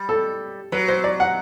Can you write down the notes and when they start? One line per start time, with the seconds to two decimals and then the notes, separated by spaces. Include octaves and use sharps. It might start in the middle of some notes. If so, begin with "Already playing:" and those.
Already playing: G3
0.09 A4
0.72 F#3 B4
0.88 C5
1.04 D5
1.20 F#5